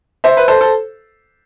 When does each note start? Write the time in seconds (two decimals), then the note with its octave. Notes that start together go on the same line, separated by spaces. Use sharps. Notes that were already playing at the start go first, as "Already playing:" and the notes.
0.24 C5 E5
0.37 B4
0.48 A4 C5
0.61 A4